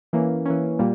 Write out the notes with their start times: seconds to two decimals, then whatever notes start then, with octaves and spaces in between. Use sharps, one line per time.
0.13 E3 A#3 C#4
0.46 E3 A#3 C#4
0.79 A#2 G3 A#3